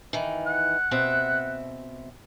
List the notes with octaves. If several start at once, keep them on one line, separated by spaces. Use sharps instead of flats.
D#3 E3
F#5
B2 C4 E5